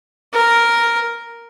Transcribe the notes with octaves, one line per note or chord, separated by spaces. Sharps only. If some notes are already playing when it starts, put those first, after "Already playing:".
A#4